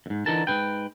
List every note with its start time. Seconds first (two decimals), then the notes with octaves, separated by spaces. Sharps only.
0.06 F2 G#2
0.26 D3 E3 D#4 G#4 A#4 A5
0.47 G#2 D#3 B4 G5